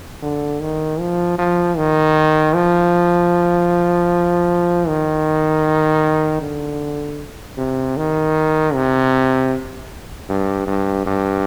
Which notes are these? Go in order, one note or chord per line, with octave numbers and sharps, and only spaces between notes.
D3
D#3
F3
F3
D#3
F3
D#3
D3
C3
D#3
C3
G2
G2
G2